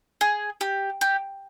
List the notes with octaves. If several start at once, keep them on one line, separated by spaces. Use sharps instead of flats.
G#4
G4
G4